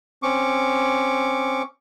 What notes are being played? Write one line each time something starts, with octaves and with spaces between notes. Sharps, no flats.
C4 C#4 C#6 D6